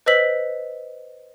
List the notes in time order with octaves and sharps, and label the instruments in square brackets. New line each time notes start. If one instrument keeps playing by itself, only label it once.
[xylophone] B4 C5 D#5 E6 B6 F#7